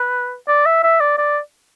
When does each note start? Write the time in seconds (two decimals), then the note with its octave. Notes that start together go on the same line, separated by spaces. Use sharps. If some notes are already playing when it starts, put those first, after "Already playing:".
Already playing: B4
0.48 D5
0.66 E5
0.83 E5
1.00 D5
1.18 D5